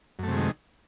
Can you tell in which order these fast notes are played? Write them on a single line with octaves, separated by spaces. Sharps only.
F#2 A3 C3 G#3 D#3